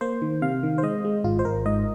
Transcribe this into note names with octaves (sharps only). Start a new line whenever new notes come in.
A#3 C5
D#3
C3 F5
D#3
C5
G#3 D#5
G#3
G#1 F4
C5
G#1 A#4
G#2 D#5